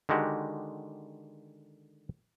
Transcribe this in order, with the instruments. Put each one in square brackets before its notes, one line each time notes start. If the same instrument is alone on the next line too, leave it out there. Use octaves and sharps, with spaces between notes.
[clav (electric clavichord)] D3 D#3 G#3 F#4 G4